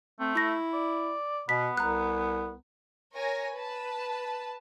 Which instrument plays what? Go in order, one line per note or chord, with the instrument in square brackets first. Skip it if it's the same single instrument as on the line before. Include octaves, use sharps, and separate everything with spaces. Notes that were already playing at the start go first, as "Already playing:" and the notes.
[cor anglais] A3 [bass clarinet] C4
[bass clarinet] E4 [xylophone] C#6 A#6
[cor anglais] D5
[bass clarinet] B2 [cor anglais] B3 [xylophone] B6
[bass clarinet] C2 [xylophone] A#5 F#6
[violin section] A#4 C#5 G#5 A#6
B4 A5